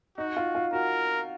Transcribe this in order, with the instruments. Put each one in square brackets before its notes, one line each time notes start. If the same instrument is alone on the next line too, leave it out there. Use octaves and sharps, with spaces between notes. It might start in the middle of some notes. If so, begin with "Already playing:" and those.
[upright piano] D#4 [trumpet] F#4
[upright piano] F4
F4
[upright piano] F#4 [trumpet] A#4